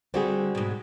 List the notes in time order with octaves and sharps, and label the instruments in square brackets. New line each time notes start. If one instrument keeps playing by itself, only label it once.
[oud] D3 G3 [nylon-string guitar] C4 F#4 G#4
[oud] G#2 B2